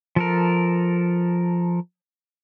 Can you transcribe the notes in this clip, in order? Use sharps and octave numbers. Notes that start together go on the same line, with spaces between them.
F3 A4 A#4